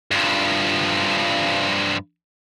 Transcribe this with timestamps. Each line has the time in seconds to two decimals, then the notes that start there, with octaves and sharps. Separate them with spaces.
0.11 G2 F3